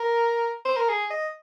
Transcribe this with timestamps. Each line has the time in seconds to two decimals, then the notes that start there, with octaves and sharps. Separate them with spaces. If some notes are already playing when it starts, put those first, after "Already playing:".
Already playing: A#4
0.65 C5
0.76 A#4
0.89 G#4
1.10 D#5